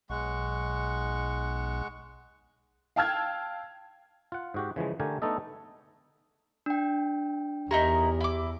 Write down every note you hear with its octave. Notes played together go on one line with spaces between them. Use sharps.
B1 G#3 F#5 C#6
F5 G5 A5 E6 F6 G#6
F4 F#5
G#2 F#4 G4
C#3 E3 F3 G#3
D3 A3 G4 A#4 G#5
A3 B3 D4 D#4 A4 D#5
D4 G5
E2 D#4 E4 G4 A#4
E4 D6